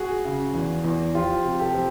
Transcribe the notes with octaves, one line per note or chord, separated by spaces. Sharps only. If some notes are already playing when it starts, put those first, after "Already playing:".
Already playing: F#4 G#4
C#3
E2
E2
F3 F4 G4
C3
G4 A4
F3